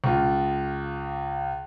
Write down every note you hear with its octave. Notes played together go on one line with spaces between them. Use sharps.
C#2 F4